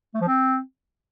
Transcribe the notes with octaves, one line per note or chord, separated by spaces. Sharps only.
A3
F3
C4